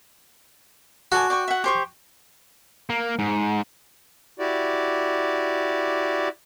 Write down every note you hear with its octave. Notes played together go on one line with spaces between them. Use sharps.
F#4 A4 D5 G#5
D5 G5 C#6
E5 F#5
G4 C5 C#6
A#3
G#2
E4 F#4 G4 D5